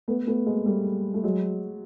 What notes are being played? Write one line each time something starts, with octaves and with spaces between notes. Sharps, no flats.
A3 B3
A3 B3
G#3 A#3
G3 A3
A3
F#3 G#3